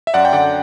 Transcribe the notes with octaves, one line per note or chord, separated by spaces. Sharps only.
E5
F#2 D5 F#5
G5
D3 D5 F#5